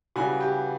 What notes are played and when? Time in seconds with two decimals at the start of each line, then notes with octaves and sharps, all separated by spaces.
0.16 C#3 E3 G3 F#4
0.40 G4